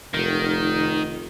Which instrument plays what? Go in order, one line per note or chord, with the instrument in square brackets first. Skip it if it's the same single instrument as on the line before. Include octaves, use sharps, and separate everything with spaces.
[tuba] F1 [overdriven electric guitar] D#3